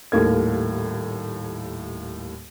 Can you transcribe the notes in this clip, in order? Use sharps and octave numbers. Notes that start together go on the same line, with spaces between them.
D#1 D#2 A2 A#3 G#6